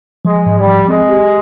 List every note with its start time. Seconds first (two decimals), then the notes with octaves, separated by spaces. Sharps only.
0.25 F3 G#3
0.46 G#2
0.57 G3
0.67 F3
0.88 G#3 C4
1.09 G4